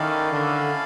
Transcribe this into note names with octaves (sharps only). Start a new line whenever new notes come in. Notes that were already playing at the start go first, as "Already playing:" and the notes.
Already playing: D#3 C#4 E4 A4 D5 F5
D3